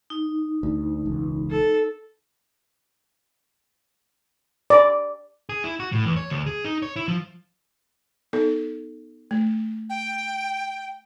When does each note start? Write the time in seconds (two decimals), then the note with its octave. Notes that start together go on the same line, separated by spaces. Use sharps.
0.10 D#4
0.63 D2
1.05 E1 C#2
1.50 A4
4.70 D5
5.49 G#4
5.64 E4
5.80 F#4
5.92 A2
6.05 E2
6.17 C#5
6.30 D2
6.46 G#4
6.65 D#4
6.82 C#5
6.96 E4
7.08 F3
8.33 B3 D#4 A4
9.31 A3
9.90 G5